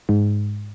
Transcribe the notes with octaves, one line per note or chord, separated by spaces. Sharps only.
G#2